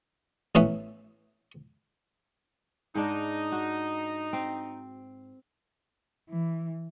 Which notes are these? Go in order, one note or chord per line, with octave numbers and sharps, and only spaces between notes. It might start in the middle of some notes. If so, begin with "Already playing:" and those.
A1 B3 C#4 E4 B4 B5
G#2 D4 D#4
F#4
C4
E3